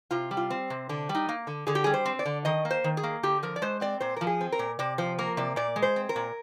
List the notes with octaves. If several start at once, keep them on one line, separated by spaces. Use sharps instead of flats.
C3 F4
G3
F4
C4
C3
D3 D4
G3
D#4
A#3
D3
D3 G#4
G4
G3 G#4
C5
C4
D5
D3
D#3 D#5
A#3
C5
D#3
G#4
A#3
D3 G4
F3 A#4
D5
G#3 C5
C4 D5
A#2 C5
F3 A#4
G#4
C4
A#4
A#2
C3 D5
F3 C5
A#3 A#4
C3 D5
A#2 D5
G#3
C5
C4
A#4
A#2